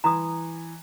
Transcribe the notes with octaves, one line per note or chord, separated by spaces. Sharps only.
E3 A#5 C6 D#6